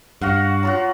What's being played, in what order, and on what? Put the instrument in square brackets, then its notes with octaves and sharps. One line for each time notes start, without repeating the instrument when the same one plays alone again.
[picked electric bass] G2 [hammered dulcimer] F#4 F5 F#5
[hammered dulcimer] F#3 F4 F#4